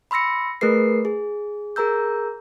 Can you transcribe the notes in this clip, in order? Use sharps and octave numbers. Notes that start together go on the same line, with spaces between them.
B5 C6 E6 A#6 C#7
A3 G#4 A#4 B4 C7
G#4
G#4 A#4 A#5 E6 G6